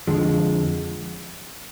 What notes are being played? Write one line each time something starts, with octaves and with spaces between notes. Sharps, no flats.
F2 D3 F3 G#3